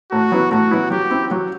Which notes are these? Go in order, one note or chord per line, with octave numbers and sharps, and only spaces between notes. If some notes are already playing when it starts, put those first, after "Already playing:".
A2 F#4
F#3 B3 E4
A2 F#4
F#3 B3 E4
F#3 G4
C4 E4
F#3